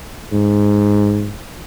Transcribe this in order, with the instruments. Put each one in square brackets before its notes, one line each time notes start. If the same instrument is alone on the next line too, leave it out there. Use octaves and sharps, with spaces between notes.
[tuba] G#2